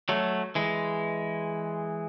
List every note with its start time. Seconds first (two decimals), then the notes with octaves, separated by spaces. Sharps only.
0.09 F#3 A3
0.55 E3 G#3